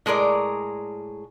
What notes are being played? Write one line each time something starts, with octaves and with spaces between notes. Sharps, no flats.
A2 G#3 G#4 A#4 D5